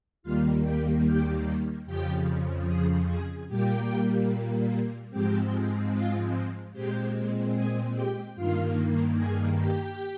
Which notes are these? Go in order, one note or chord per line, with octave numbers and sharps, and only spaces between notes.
D#2 D#3 G3 A#3 F4 F5
G4 G5
G4 G5
F2 C#3 F3 G4 G5
G#4 G#5
G#4 G#5
A#2 G3 A#3 G4 G5
G#2 F3 G#3 C4 G4 G5
F4 F5
A#2 G#3 C4 G4 G5
G#4 G#5
G4 G5
G2 D#3 A#3 F4 F5
G#4 G#5
G4 G5